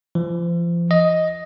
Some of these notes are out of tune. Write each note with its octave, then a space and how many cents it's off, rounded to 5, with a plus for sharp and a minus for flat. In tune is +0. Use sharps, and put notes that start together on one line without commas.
F3 -35
D#5 +5